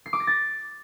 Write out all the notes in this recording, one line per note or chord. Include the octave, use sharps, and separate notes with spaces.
C7
D6
A#6
A6